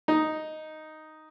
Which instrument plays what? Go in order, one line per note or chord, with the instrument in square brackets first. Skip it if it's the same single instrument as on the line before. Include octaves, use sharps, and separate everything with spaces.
[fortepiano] D#4